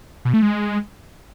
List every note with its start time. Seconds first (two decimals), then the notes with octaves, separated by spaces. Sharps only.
0.25 B2
0.34 A3
0.42 G#3